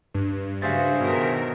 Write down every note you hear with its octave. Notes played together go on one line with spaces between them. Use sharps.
G2
C#3 G3 F#4 G#4 C5 E5 F5 A6
B2 D#3 A#4